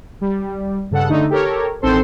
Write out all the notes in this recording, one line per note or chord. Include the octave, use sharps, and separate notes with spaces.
G3
G2 C#3 A4 F#5
D3 A3 D#4
G4 A4 A#4 C#5
A1 D#3 C4 A4 C5 C6